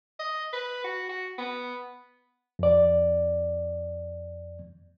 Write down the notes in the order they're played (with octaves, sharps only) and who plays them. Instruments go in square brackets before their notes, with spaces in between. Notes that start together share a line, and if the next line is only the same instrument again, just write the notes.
[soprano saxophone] D#5
B4
F#4
F#4
B3
[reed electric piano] F2 D5